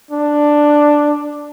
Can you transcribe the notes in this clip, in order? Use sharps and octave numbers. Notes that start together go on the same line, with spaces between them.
D4